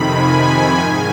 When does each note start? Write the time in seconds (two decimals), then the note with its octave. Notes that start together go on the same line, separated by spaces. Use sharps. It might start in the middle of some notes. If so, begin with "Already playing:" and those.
Already playing: F2 C3 D#3 B5
0.11 G#5
0.77 G#2 D#3